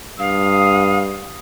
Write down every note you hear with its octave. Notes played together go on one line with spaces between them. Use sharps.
G2 F5 D#6